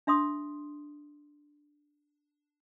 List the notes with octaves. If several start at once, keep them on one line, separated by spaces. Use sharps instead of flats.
D4 E5 C6 D#6